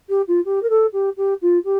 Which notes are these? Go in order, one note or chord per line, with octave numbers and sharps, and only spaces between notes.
G4
F4
G4
A#4
A4
G4
G4
F4
G4